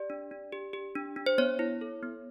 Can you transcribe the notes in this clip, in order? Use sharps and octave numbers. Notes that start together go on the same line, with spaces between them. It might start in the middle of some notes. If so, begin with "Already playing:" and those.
Already playing: G4 D5
D4
D4
G4
G4
D4
D4
C5
B3 C#5
E4
A4
B3